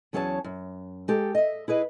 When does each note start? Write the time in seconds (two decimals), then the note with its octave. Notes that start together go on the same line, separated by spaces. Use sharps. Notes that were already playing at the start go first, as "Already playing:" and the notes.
0.13 E2 F#3 C#4 G#4 C#5 A5
0.44 F#2
1.08 G#3 G4 A4
1.35 D#5 E5
1.68 E4 G#4 B4 D#5